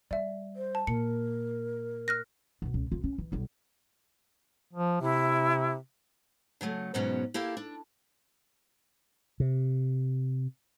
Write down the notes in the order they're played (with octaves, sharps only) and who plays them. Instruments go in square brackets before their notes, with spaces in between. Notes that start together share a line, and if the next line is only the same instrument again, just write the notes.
[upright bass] G3 [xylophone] D5 E5
[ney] C5
[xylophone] A5
[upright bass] A#2 [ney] A#4 [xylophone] C#7
[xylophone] F6 F#6 A#6
[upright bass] B1 B2
C#2
C2 F4
C#4
E3
B1 G3
[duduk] F3
[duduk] C3 [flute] E4
[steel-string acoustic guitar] C#3 F#3 G#3 A3
E2 G#2 B2 F#3 C#4
A#3 E4 G4 A4 F5
D4
[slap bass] C3